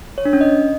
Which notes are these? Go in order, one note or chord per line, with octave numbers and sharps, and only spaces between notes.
C#5
D4
C#4
D#5